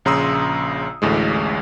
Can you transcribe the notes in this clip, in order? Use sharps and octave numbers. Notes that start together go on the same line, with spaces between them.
A#1 C#3 A#5 C6 D#6 E6
A1 D2 A2 G#3